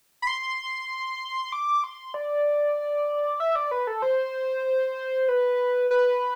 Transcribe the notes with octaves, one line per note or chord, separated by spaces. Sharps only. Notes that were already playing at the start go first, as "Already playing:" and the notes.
B5
C6
D6
C6
D5
E5
D5
B4
A4
C5
B4
B4